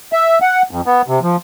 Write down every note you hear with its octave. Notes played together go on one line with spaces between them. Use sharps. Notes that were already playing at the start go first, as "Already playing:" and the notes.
E5
F#5
F2
B3
C3
F3